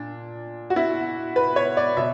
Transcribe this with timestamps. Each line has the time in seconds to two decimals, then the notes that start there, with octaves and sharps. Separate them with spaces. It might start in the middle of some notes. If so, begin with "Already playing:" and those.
Already playing: A#2 D4
0.70 F#4
0.76 E4
1.36 B4
1.56 C#5
1.77 D5
1.97 B2 E5